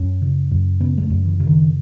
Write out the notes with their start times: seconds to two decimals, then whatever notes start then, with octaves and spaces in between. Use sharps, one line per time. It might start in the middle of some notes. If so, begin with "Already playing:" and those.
Already playing: F#2 C#4
0.22 C#3
0.51 F#2
0.80 C#3 B3
0.98 G#3
1.02 A3
1.10 F#2
1.25 E3
1.40 C#3
1.47 D#3